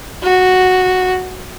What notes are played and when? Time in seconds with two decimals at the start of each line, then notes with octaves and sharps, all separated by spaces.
0.23 F#4